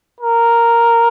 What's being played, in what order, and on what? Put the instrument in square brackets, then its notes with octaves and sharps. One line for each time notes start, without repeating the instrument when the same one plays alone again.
[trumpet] A#4